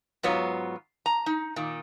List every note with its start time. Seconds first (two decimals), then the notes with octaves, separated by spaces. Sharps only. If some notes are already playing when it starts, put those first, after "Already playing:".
0.23 G#2 F#3 B3 F4 C#5
1.06 A#5
1.26 D#4
1.56 A#2 D#3